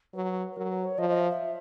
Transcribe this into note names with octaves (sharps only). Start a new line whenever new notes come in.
F#3 B4
B4
F#3 A#4
B4
C#5
F3 D#5
D#5
E5
E5